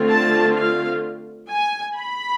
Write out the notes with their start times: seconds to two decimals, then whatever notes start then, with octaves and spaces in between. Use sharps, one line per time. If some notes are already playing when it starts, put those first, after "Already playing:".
Already playing: D3 A3 C4 F4
0.09 A5
0.56 F5
1.50 G#5
1.97 B5